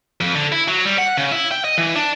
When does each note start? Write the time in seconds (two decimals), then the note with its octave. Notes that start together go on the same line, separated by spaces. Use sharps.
0.20 F2
0.35 D3
0.52 E4
0.68 F#3
0.85 G3
0.98 F#5
1.17 C#3
1.32 E4
1.52 G5
1.65 D#5
1.78 E3
1.96 D4